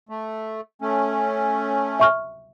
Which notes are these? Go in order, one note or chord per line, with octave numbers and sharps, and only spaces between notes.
A3
A3 C#4
E5 C#6 F6